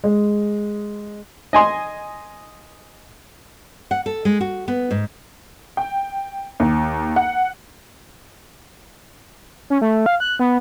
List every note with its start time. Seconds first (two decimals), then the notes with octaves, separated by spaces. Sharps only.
0.04 G#3
1.53 D#5 G#5 C6
3.91 F#5
4.06 A4
4.25 G#3
4.41 F#4
4.68 B3
4.91 G#2
5.77 G5
6.60 D#2
7.16 F#5
9.70 C#4
9.81 A3
10.06 F5
10.20 F#6
10.39 B3